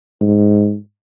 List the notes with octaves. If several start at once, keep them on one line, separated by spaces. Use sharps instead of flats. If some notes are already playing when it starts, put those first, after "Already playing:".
G#2